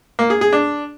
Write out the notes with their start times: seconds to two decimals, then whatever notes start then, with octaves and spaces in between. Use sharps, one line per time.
0.19 A#3
0.30 G#4
0.41 G#4
0.53 D4